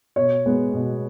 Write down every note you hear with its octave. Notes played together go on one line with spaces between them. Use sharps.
B2 C#5
G#3 B3
B2